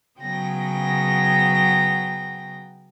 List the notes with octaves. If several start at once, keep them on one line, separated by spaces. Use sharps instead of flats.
C#3 F#3 B3 G5 A#6